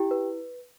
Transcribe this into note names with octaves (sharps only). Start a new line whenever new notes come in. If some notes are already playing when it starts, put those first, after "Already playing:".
Already playing: E4 G4 G5
B4